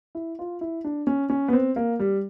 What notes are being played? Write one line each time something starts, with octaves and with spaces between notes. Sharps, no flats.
E4
F4
E4
D4
C#4
C#4
B3
C4
A#3
G3